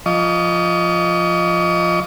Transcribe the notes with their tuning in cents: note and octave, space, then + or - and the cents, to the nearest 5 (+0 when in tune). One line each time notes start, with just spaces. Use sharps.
F3 -5 D#5 +0 C#6 +40